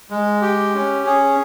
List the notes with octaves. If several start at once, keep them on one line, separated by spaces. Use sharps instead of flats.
G#3
G4
C#4
G#4